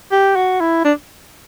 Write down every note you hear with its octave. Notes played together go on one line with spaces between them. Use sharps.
G4
F#4
E4
D4